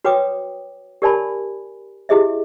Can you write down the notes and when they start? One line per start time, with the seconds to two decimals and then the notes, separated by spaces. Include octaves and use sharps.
0.04 F#4 B4 C#5 G5 D6 D#6
1.02 G4 A#4 D5 G#5 A5 B5
2.09 E4 G4 G#4 D#5 E5